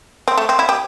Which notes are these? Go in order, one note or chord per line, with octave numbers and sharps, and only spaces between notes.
C4
A3
C4
E4
G4